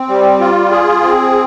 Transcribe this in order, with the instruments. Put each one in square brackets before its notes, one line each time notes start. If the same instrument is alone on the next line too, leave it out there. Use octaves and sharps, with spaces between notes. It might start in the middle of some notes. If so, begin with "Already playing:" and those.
Already playing: [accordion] C4
G3
F4
G#4
C4